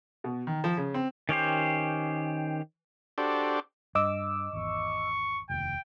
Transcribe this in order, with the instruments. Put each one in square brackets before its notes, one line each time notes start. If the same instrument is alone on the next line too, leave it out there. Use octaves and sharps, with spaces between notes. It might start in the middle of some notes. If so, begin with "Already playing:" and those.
[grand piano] B2
D#3
F3
C#3
C4
[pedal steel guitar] D#3 C#4 G4 C5
[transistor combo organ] D4 F#4 G4 A4 C5 D5
[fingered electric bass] G2 [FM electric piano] D#5 D6 E6
[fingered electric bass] G#1 E2 [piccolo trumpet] C#6
[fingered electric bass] F1 D#2 [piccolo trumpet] G5